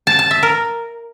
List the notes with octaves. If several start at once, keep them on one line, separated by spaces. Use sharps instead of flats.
A5
A5
E5
A#4